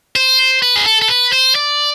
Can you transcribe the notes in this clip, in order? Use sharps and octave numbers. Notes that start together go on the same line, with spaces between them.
C5
B4
G#4
A4
A4
B4
C5
D5